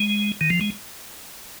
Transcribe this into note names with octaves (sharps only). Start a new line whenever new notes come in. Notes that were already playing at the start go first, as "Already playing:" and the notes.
Already playing: G#3
D#3
F3
G#3